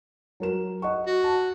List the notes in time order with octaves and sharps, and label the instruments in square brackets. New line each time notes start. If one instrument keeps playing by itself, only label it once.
[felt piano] F#3 A#4 E7
D#5 F#5 C#6
[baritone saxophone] F#4
[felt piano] A5